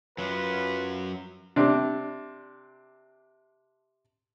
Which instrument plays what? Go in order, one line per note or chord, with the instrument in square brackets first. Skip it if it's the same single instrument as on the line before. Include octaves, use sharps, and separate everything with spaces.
[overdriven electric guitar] F#2 F#3 [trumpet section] F4 B4
[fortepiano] C3 D4